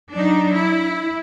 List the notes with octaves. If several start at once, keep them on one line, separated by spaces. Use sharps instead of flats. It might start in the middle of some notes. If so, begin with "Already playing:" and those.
F#3 D4 D#4
E4